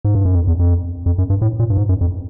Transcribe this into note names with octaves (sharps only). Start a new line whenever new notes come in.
G#2
G2
F#2
F2
E2
F2
F2
F#2
G2
A2
A#2
G2
G#2
F#2
F2